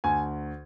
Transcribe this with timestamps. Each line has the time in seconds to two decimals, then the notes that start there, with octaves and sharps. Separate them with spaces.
0.04 D2 G#5